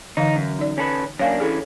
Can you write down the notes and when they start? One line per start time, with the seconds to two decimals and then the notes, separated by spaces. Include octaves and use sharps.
0.17 D3 E3 D#4 F5
0.36 F#2
0.59 D#4 D5
0.78 C#4 A4 B4
1.19 F#2 A#3 D4 C#5 F5 G#5
1.40 D3 E3 C#4 G#4 A4